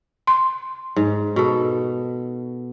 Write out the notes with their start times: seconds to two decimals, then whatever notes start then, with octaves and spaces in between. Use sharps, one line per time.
0.27 C6
0.96 G#2
1.36 B2 A4